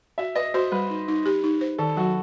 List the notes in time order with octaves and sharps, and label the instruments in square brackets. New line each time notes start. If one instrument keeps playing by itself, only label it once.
[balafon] F#4 [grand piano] E5
[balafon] B4 [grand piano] D#5
[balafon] F#4 [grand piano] C5
[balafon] G3 [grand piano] B4
[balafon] D#4
D#4
G4
D#4
C5
[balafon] D#3 [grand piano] A4
[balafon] F#3 [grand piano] F#4